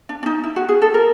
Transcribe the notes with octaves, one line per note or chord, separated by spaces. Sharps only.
D4
D4
D#4
E4
F#4
G#4
A4
A#4